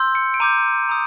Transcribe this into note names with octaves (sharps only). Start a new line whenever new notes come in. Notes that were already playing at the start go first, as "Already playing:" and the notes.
Already playing: C6 E6 G6
C#7
D7
A#5 D6 G6 D#7
A#5 D#6